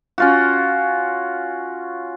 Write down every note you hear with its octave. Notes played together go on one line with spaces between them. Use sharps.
C#4 F4 F#4